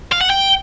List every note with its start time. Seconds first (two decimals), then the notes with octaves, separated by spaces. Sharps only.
0.12 F5
0.21 F#5
0.30 G5